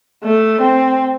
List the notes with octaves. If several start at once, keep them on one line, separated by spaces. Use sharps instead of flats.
A3
C4